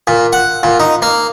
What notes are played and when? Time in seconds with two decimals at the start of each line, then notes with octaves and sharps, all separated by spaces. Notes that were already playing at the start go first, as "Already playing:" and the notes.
0.07 A#2
0.33 F#5
0.63 A#2
0.80 D#4
1.02 A#3